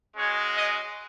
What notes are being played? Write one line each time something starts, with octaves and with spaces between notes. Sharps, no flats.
G#3 C#4 F#4 C#5
D#5